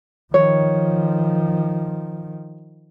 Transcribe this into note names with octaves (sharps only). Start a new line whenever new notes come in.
D#3 F3 C#5